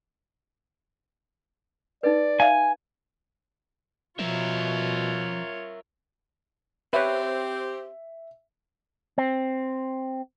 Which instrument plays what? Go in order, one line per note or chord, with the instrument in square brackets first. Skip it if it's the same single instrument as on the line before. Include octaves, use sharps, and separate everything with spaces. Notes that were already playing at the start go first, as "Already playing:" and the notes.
[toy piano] D#4 B4 [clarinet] D5
[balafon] E5 F5 [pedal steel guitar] G#5
[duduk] B2 [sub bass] F3 [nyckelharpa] F4 C#5 [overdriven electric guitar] A#4 E5
[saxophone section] C4 G4 [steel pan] B4 C#5 [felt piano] E5
[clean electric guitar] C4